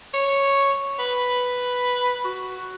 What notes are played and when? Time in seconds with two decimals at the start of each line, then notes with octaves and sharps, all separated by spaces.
0.14 C#5
0.99 B4
2.24 F#4